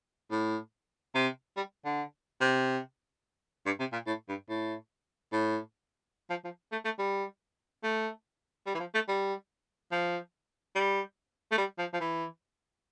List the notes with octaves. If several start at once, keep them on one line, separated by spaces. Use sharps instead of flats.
A2
C3
G3
D3
C3
G2
C3
A#2
A2
G2
A2
A2
F3
F3
A3
A3
G3
A3
G3
E3
F3
A3
G3
F3
G3
A3
G3
F3
F3
E3